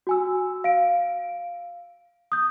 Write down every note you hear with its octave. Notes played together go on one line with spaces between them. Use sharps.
F#4 G#5 E6
F5 D7
D#6 G6